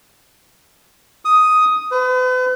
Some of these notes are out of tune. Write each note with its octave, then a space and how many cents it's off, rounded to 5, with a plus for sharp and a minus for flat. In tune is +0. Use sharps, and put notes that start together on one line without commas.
D#6 +5
B4 +40